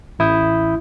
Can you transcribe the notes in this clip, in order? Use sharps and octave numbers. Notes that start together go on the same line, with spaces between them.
A1 E4 D#6 G6